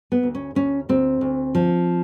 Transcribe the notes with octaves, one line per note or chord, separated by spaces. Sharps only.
B3
D2
C#4
D2 C#4
D2 C4
D2
F3